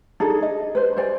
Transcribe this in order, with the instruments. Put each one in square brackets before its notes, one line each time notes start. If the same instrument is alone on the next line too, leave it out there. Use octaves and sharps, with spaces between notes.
[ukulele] D4 D#4 G#4 A4
D#5
B4 C5
C5 D5 G#5